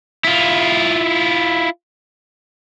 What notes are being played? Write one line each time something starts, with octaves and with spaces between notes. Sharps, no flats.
E4 F4